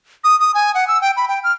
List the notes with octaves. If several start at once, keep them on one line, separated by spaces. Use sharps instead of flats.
D#6
D#6
G#5
F#5
E6
G5
B5
G5
F6